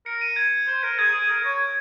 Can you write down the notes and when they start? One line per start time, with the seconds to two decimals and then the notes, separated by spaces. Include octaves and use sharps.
0.06 A#4 C#7
0.21 D#7
0.36 G#6
0.67 C5
0.83 A#4
0.99 G#4 G#6
1.14 G#4
1.30 A#4
1.45 C#5